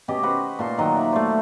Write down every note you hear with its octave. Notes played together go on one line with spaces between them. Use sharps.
B2 C#4 G4 D#5
F#4 B4 C5
A#2 A5 C6
D#3 F#3 D#5 A#5
D5 E5
A3 C5